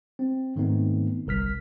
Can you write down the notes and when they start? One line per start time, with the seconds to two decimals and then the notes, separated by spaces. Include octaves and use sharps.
0.19 C4
0.56 G#2 D#3 A3 B3 C4 D#4
1.26 G1 C2 A#4 F6 B6